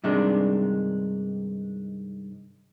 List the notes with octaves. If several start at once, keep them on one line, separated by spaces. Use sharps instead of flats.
G2 C3 D#3 G#3 D4